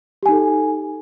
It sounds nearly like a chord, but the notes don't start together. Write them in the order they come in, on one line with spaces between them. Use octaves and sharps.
G4 G#5 D#4 A4